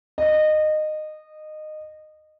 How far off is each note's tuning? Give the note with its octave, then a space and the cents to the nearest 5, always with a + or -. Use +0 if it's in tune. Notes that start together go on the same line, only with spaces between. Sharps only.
D#5 -20